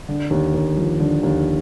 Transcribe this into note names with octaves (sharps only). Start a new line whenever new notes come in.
D3
D#2
D#2
F3
D3
D#2